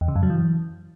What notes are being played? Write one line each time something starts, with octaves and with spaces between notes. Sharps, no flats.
E2
C#3
F#2
F#3
E3